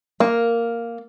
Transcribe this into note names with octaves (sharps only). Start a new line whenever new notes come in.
A#3